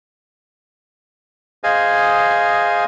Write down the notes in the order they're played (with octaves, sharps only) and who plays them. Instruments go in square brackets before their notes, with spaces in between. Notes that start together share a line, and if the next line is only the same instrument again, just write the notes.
[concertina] G#4 C5 D#5 F5 G#5